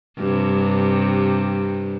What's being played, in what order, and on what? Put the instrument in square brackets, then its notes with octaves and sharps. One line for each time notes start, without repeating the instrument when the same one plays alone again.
[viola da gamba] G2 C3